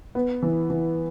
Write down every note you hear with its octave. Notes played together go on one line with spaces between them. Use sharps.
B3
E3
E3